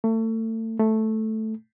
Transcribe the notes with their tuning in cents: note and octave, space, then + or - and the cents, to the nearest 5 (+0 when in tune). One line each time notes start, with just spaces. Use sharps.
A3 +30
A3 -5